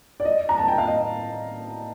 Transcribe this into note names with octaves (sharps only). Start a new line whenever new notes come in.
D5
D#5
A#5
A5
G5
F5
D#5